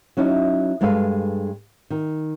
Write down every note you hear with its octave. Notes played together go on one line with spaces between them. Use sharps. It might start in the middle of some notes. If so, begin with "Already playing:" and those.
F#3 C#4 D#4 E4
G2 G#3 A4 B4 F5
D#3